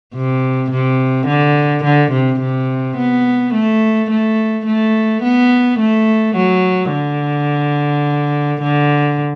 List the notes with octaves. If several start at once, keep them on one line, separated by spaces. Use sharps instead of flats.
C3
C3
D3
D3
C3
C3
B3
A3
A3
A3
B3
A3
F#3
D3
D3